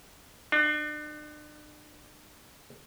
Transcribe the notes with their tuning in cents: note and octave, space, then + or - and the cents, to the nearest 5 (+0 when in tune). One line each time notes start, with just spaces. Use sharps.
D4 +40